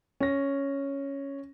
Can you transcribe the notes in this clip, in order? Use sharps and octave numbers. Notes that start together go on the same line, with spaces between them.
C#4 A#6